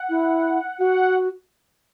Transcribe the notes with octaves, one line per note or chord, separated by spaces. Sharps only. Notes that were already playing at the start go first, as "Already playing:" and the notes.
Already playing: F#5
E4
F#4 F#5